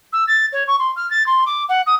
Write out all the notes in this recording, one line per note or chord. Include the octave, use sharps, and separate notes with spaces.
E6
A6
C#5
C#6
C6
F6
A6
C6
D6
F#5
D#6